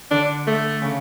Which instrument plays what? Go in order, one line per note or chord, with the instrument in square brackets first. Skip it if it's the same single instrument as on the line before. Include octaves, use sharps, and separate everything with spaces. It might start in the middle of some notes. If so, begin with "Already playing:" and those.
[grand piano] D3 [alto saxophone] D4
[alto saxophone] A3
[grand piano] C#3